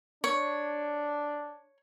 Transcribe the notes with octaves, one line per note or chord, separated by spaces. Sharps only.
D4 C#5